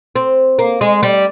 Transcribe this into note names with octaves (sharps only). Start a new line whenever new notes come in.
C4
A#3
G#3
G3